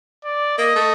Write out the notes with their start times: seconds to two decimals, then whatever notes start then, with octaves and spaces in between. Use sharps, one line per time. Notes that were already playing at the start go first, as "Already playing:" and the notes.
0.25 D5
0.58 A#3 D#5
0.76 A3